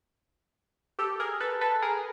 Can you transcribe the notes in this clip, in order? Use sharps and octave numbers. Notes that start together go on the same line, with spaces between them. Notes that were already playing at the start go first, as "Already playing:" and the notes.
G4 A4
G#4 A#4
A4 B4
A4 B4
G#4 A#4